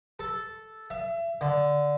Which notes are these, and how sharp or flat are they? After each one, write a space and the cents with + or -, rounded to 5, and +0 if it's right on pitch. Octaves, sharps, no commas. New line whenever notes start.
A4 -5
E5 +35
D3 -5